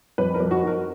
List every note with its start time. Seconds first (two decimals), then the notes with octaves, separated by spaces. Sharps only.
0.18 F2 B4
0.34 A#4
0.40 F2
0.51 F#4
0.62 D#3
0.67 A#4